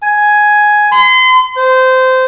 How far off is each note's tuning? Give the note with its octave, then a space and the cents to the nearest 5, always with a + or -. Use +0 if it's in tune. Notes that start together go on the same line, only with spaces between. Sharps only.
G#5 +5
C6 -35
C5 -20